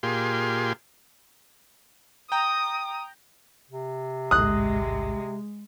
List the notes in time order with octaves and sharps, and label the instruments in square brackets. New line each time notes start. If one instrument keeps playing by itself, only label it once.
[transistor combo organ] A#2 F4 G4 G#4 C6
[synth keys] G5 A#5 [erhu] D#6
[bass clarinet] C3
[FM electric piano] A1 D2 G#2 [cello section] G#3 [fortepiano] D#6 F#6